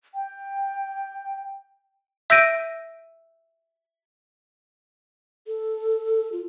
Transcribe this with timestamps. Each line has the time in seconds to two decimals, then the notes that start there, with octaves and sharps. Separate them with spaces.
0.15 G5
2.30 E5 E6 G6 A#6 D7 D#7
5.47 A4
6.32 F4